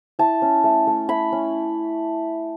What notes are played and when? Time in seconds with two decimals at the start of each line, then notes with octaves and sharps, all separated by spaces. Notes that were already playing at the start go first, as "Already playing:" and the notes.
0.19 E4 A5
0.42 C#4
0.64 A3
0.87 A3
1.09 E4 B5
1.32 C#4